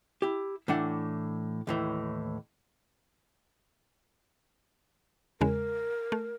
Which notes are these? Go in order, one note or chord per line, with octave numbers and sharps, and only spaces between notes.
E4 G4
A2 E3 D4 F#5
D#2 A2 E3
E2 C#3 G#3 A#4
A3